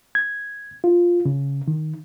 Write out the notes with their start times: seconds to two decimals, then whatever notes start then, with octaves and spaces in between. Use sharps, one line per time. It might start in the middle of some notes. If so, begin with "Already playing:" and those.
0.15 G#6
0.84 F4
1.25 C#3
1.68 D#3